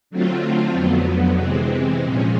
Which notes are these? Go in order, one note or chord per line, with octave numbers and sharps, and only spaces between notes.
D3 F#3 A3 C4 F4
F2 D3 F#3 B3
C3 E3 G#3 C4
A#2 F3 G#3 C#4